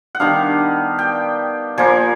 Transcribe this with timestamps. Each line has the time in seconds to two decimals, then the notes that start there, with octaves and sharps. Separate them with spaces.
0.15 F#5
0.20 D#3 G3 B3 D4 F5
0.99 G5
1.78 A#2 F3 A#3 G#5